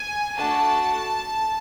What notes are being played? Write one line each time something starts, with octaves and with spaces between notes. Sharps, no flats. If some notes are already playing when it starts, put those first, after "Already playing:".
Already playing: G#5
A3 D4 F#4 A4 A5